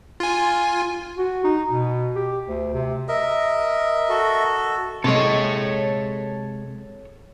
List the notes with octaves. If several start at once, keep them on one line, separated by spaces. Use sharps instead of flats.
F4 G#5
F#4
D#4
B2
G4
D2
C3
A#4 D#5 E5
F#4 A4
C3 G#3 A4 C#5